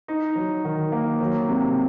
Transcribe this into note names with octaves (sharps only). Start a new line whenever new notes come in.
D#4
F#3
D#3
A#3
F#3
C3